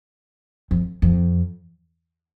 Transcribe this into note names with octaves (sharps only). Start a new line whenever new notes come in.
F2
F2